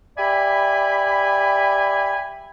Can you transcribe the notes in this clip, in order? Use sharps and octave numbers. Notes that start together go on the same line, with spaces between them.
G4 D5 E5 G#5 B5